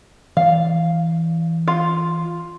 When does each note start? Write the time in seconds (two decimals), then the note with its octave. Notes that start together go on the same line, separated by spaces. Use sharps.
0.37 E3 D5 F5
1.68 F4